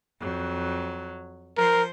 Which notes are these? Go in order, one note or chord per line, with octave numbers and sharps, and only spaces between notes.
F2 F#3
F3 A#4 C5